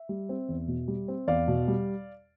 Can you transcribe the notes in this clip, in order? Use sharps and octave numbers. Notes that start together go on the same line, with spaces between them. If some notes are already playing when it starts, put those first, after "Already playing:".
Already playing: E5
G3
C4
E2
B2
G3
C4
E2 D5 F5
B2
G3